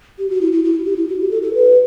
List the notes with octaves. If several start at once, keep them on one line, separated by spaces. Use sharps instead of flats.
G4
F#4
E4
E4
E4
G4
E4
F#4
G4
A4
A4
B4